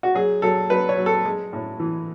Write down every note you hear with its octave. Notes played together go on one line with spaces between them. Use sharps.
F#4
F#3 G#4
F#3 A4
F#3 B4
C#5
F#3
A4
G#3
A2
E3